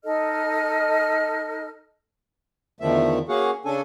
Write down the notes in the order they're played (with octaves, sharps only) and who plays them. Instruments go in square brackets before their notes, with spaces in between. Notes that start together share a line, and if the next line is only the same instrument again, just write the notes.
[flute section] D#4 A4 D#5 F6
[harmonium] E2 D3 D#3 F3 A3 E5
A#3 C#4 F#4 G#4 F5 F#5
C#3 C#4 D4 A4 G#5